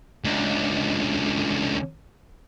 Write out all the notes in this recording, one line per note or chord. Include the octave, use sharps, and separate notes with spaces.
C#2 D3